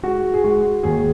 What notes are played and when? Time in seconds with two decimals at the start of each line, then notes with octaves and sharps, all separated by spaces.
0.03 G#3 F#4
0.34 G#4
0.44 G#3 F#4
0.83 D#2 G#4